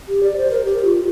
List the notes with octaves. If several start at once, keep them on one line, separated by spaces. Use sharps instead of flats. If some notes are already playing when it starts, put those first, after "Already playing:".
G4
D5
C5
A#4
G4
F4